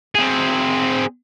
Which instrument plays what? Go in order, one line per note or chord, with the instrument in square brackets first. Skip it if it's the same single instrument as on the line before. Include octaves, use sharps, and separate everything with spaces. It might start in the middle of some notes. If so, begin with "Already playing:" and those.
[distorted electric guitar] C4 G#4